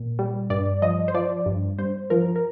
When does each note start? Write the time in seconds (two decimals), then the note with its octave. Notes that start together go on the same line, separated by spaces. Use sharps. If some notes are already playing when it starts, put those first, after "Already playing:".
Already playing: A#2
0.19 G3
0.50 G2 D5
0.82 F3 D#5
1.08 C5
1.14 F3 D5
1.46 G2
1.78 G2 C5
2.10 F3 A#4
2.36 A#4